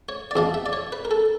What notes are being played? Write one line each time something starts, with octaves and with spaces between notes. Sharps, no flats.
C#5
D5
E2 C3 F3 D#5
E5
D5
C#5
B4
A#4
A4